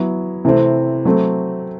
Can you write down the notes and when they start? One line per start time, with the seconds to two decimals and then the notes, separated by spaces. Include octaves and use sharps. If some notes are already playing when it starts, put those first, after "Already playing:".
Already playing: F#3 B3 E4
0.45 C3 E3 A3 C4
1.05 F#3 A3 C4